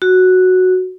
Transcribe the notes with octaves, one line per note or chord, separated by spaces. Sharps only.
F#4